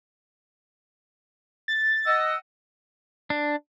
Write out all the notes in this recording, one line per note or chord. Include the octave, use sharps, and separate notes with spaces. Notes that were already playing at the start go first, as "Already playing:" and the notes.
A6
D#5 F#5 E6
D4